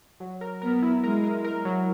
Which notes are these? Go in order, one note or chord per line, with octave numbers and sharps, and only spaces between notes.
F#3
A#4
B3 A#4
E4
G#3 A#4
A#4
A#4
F#3